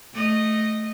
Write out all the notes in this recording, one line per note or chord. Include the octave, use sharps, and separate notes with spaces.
A3 D#5